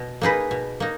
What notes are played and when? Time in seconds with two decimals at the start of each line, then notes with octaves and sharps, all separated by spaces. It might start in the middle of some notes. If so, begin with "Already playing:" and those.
Already playing: B2
0.21 A#3 D#4 G#4 B4
0.51 B2
0.80 A#3 D#4